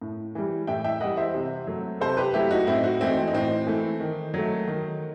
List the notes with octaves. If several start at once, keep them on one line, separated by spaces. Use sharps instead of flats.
A2
E3 G3
A2 E5 G5
E5 G5
E3 G3 D#5 F#5
C5 E5
C3
F#3 A3
C3 A4 C5
G4 B4
F#3 A3 E4 G4
D#4 F#4
A2 C4 E4
D#4 F#4
E3 A3 C4 E4
C4
D#4
A2 C4
E3 A3
D#3
F#3 A3
D#3